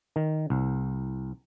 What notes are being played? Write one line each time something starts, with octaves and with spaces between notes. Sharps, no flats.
D#3
C2